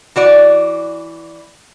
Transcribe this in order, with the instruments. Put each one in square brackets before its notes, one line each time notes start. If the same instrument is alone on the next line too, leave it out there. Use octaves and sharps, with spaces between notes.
[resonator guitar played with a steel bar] E3 F#4 D5